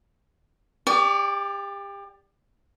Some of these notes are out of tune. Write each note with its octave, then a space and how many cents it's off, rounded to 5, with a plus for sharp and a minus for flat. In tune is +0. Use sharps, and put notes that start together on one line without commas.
G4 +30 D5 +0 C#6 +45